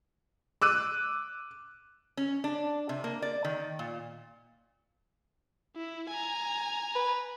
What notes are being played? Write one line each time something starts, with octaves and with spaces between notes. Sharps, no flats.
D6 E6 F#6 D#7
C#4
D4
C3
A#3
D5
D#3
A#2
E4
G#5 A#5
B4